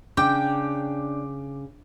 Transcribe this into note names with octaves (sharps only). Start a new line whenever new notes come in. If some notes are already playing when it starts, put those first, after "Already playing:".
C#3 D4 G5 D6